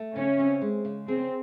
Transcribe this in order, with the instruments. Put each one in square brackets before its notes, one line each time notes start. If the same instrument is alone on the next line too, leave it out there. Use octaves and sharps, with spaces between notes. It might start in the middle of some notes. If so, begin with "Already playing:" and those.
Already playing: [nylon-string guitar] A3
[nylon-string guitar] C#3 [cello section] C#4
[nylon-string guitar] C4
G#3
C#3
[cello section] C4 [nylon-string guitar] G#4